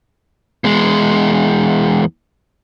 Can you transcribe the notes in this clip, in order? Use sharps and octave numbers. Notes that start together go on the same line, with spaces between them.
E2 G#3